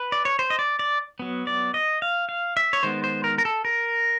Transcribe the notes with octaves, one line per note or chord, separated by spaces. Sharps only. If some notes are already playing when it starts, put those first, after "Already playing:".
Already playing: B4
D5
C#5
C5
D#5
D5
D5
F#3 B3
D5
D#5
F5
F5
E5
C#5
D#3 G#3 B3 C5
C5
A#4
A#4
A4
A#4